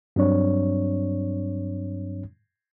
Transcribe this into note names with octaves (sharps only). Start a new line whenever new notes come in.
G2 F#3 C4 D4 C#5